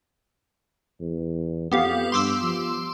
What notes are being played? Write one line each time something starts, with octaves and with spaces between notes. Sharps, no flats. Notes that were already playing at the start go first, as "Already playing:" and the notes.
E2
F2 B3 G4 F5
G2 C6 D6 E6
F3